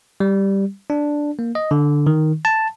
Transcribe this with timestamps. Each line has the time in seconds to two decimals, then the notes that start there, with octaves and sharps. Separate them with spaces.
0.20 G3
0.90 D4
1.39 A#3
1.55 D#5
1.71 D3
2.07 D#3
2.45 A5